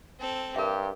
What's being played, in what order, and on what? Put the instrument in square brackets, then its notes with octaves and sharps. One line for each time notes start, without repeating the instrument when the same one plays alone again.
[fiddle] C4 A4
[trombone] G2 [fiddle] G4 [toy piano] A#4 E5